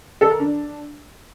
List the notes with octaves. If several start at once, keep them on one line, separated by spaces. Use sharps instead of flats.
A4
A#4
D4